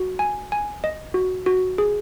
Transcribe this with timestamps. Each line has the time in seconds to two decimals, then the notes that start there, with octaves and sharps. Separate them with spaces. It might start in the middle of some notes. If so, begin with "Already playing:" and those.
Already playing: F#4
0.19 G#5
0.52 G#5
0.84 D#5
1.14 F#4
1.46 F#4
1.78 G#4